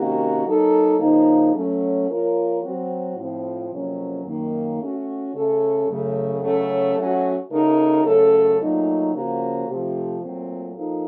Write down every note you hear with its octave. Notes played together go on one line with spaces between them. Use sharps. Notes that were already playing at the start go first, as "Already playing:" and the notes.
Already playing: C3 D#3 A#3 C#4 F#4
F#3 A#3 D#4 A4
C#3 F3 A#3 D#4
F#3 A3 C#4
F3 A#3 F4 A#4 C#5
F#3 C4 F#4
A2 F3 C4
F2 C3 F#3 A#3 C#4
F#2 D#3 A#3
A3 C#4 F#4
C#3 A3 C#4 A4
F#2 C#3 A3
C#3 F#3 A3 C#4 A4
F#3 A3 C#4 F#4
C#3 A3 D#4 F#4 A#4
F#2 C#3 A3 C#4 A4
A#2 F#3 A3 D#4
C#3 F3 A#3 C#4 F#4
C3 F3 A3
A#2 F#3 A3 C4
F3 A#3 D#4 A4